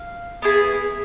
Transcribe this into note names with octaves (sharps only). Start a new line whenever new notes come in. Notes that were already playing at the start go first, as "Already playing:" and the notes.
Already playing: F5
B3 E4 G#4